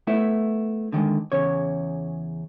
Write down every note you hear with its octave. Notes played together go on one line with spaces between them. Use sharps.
A3 B3 E4
D3 D#3 F#3 G#3
E2 C#3 C#5